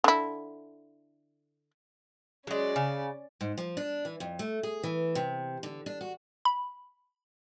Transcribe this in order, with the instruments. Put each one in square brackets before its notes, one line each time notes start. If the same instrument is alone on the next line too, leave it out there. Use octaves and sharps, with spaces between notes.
[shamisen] D3 E4
[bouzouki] F#3 G#3 [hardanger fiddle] C#4 D5
[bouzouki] C#3
[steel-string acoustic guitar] G#2
F3
D4
E3
F2
A3
G#4
E3
C3
D3
D4
F#4
[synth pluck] B5